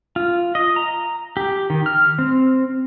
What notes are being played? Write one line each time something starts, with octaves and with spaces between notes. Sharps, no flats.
F4
D#5
A#5
G4
D#3
F6
C4